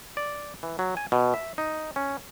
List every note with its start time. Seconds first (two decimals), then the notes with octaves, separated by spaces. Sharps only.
0.17 D5
0.63 E3
0.79 F#3
0.97 G#5
1.12 B2
1.34 E5
1.58 D#4
1.96 C#4